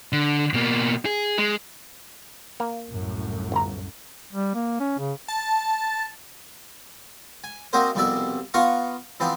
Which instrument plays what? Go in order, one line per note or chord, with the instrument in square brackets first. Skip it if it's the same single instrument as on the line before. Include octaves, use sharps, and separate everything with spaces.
[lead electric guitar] D3
B2 A#3
G#4
G#3
[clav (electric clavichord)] A#3
[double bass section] C2 F#2 A2
[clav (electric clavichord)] G1 A#5
[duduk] G3
A#3
C#4
C#3
[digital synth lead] A5
[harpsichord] G#5
A#3 C4 D#4 F#4 A#4 C5
C2 F2 B2 D5 E5
B3 F4 F5 F#5 A#5 C#6
E3 F3 B3 C4 D4